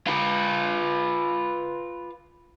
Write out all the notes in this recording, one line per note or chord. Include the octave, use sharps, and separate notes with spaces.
F4 B4